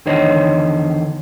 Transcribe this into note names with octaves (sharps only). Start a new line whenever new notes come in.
E2 D3 D#3 C5 C#5 D#5